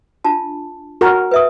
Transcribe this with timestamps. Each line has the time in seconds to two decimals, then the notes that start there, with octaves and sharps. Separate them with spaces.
0.24 D4 F4 A5
1.01 F#4 A#4
1.31 B4 E5 D#6